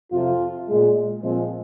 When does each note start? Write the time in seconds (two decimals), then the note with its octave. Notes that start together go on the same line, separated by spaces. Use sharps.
0.12 F2 C3 F3 F4
0.68 A#2 G#3
1.23 A#2 F3 G#3 C4